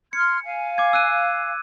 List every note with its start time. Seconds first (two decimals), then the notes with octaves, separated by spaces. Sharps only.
0.13 C6 F6 G#6 C#7
0.45 F5 G#5
0.78 D6 G#6
0.93 E6 F#6 D#7